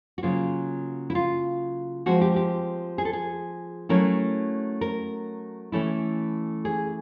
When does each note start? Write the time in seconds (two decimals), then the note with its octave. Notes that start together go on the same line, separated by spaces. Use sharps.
0.18 F#4
0.23 C#3 F#3 A#3 F4
1.10 E4
1.15 F4
2.06 F3 G#3 C4 F#4
2.21 G4
2.36 G4
2.98 G#4
3.05 A4
3.13 G#4
3.89 F#3 A3 C#4 E4 A#4
4.81 A#4
5.72 E3 A3 C#4 E4 A4
6.65 G#4